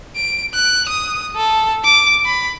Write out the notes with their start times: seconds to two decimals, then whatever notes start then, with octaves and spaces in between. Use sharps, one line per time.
0.16 D7
0.54 F#6
0.88 D#6
1.36 A4
1.84 D6
2.25 B5